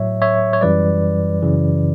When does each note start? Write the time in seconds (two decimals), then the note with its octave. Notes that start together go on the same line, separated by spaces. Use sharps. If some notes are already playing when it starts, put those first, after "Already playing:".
Already playing: A2 F#3 C#5 E5
0.22 C#5 E5
0.53 C#5
0.61 F#2 E3 G3 B4 D5
1.42 F#2 C#3 E3